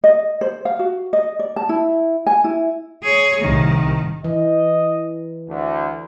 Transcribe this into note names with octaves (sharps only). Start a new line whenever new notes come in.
D#5
C5
F5
F#4
D#5
D5
A5
E4
G#5
E4
G#4 C#5
C2 A2 D#3
E3 D#5
D2